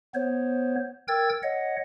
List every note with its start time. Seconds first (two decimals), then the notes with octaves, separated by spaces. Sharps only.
0.14 B3 C5 C#5
1.08 A#4 G5 E6 G#6 A6
1.43 C#5 D#5 F#5